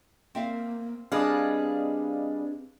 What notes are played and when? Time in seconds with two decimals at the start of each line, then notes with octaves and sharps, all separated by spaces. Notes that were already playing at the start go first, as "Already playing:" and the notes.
0.35 A#3 C4 E5 F5
1.12 G3 C4 D4 G#4 B4 D5 D#5 F5